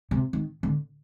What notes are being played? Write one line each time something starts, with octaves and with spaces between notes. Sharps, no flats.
C3
D#3
D3